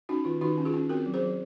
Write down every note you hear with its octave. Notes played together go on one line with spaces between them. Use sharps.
C#4 D#4 F#4
D#3 F4
D#3 D#4 F#4
C#4
F4 G#4
C#4
C4 F#4 A#4
F#3
G#4 C5
F#3